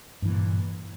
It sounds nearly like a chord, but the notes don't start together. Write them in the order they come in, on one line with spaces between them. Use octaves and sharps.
G2 E3 A#2